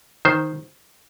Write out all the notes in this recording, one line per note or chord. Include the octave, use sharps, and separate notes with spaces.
D#3 C5